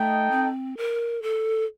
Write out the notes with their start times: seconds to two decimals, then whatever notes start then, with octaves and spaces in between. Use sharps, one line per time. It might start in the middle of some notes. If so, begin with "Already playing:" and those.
Already playing: A3 D#4 A4 D#5 G5
0.31 C4
0.77 A#4
1.22 A4